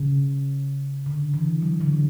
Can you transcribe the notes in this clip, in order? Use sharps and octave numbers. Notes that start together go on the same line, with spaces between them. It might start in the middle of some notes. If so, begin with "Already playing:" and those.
Already playing: C#3
D3
E3
F#3
D3